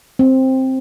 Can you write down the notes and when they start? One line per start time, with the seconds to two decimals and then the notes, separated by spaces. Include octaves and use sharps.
0.19 C4